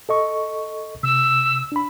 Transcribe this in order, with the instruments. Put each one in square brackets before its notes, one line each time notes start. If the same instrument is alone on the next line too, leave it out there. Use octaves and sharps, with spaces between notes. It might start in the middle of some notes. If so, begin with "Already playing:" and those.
[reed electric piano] A4 D#5 C#6
[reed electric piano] C3 [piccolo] E6
[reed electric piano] D4 B5